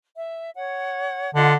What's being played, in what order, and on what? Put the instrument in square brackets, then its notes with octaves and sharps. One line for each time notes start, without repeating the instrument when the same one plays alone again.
[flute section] E5
C#5 F#5
[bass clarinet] D3 [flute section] F4 D#5 F#5